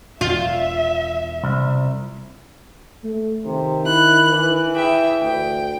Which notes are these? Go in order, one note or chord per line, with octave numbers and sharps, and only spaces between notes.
E1 F4 E5
C2
A3
C3 D#3
E4 F#6
E3
G#4 E5 G5
D2 G5